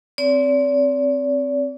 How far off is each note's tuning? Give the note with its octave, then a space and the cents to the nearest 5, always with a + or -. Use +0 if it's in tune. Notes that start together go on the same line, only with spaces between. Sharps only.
C4 +0 D5 -40